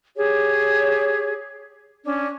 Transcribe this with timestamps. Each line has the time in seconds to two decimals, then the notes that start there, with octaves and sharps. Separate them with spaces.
0.16 G4 G#4 C#5
2.05 C#4 D4